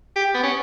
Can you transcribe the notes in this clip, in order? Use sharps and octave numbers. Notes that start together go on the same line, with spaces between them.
G4
B3
C#4